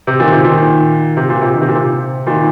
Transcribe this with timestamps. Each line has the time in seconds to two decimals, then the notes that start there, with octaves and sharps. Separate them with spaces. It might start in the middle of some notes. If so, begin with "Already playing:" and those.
0.07 C3
0.20 A#2 D#3
0.32 C3
0.44 A#2 D#3
1.17 C3
1.29 A#2
1.42 C3
1.54 D#3
1.61 C3
1.68 A#2
1.75 C3
2.26 A#2 D#3